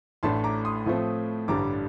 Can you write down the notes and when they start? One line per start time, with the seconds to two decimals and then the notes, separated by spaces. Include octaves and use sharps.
0.23 A1 A2 A3 D4 A5 C6
0.44 A#5 D6
0.65 C6 D#6
0.86 A2 F3 A3 C4
1.48 A1 G2 D3 G3 D4 A#5 D6